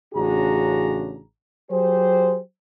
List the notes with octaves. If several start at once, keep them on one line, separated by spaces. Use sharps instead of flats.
A1 C#3 D4 F#4 G#4 A#5
F#3 G4 G#4 C5